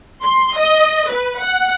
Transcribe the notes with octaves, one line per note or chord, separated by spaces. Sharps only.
C6
D#5
B4
F#5